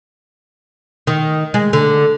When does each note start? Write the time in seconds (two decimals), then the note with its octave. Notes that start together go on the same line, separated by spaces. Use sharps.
1.07 D#3
1.54 G#3
1.73 D3